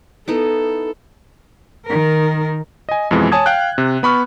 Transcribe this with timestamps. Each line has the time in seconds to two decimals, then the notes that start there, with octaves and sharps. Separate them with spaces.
0.28 B3 D#4 E4 A4
1.86 D#3 A#4
2.89 D#5 G#5
3.11 F2 B2 E3 G#3
3.32 C#5 G#5 A5 D#6 G#6
3.46 F5 G5 F#6
3.78 C3
4.03 B3 B5 C#6 F6